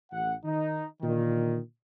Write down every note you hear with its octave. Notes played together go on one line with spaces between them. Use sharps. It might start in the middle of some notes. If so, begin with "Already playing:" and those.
A1 F#5
D#3 D#4
A#2 D3 D#3